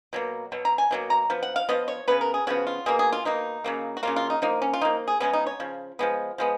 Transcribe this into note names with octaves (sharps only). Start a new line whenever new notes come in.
B2 F#3 A#3
B2 F#3
A#5
G#5
B2 F#3 A#3
A#5
F3 B3
F#5
F5
F3 B3 D#5
C#5
C#3 F3 B3 B4
A#4
G#4
C#3 F3 B3 F#4
F4
B2 A#3 G#4
G#4
F4
B2 A#3 D#4
C#3 F#3 A#3
F#4
C#3 F#3 A#3 F4
F4
D#4
F3 A#3 D#4
C#4
F4
F3 A#3 D#4
G#4
C#3 F3 G#3 B3 C#4
D#4
C#5
C#3 F3
F3 G#3 B3
F3 G#3 B3